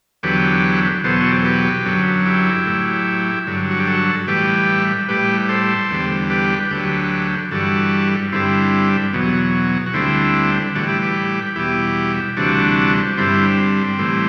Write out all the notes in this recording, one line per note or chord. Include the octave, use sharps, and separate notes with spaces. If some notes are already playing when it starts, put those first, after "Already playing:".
E2 D3 F#3 G4 B4
E2 B2 F#3 A4 C5
F#4
G4
A4
G4 B4
F#2 D3 F#3
E4 G4
A2 F#3
G2 D3 F#3
F#4
G4
F#4 A4
A2 E3 G3 G4 B4
A2 G3 G4 B4
A4 C5
E2 D3 G3
G4 B4
D2 D3 F#3 G4 B4
G2 E3 G3 F#4 A4
G2 D3 G3 C4 E4
E2 B2 F#3
F#4
D2 D3 G3 C4 E4
A2 E3 G3 D4 F#4
E4 G4
G4 B4
E2 B2 G3 E4 G4
D2 C3 E3 G3 D4 F#4
G2 D3 G3 C4 E4
C4
A2 E3 G3